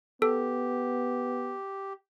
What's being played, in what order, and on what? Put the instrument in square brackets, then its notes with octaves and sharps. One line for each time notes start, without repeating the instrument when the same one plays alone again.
[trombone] B3 [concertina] G4 [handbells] A4